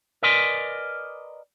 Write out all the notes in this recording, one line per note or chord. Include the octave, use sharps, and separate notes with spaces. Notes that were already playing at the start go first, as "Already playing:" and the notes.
A#4 B4 D5 D#5 G#5 C6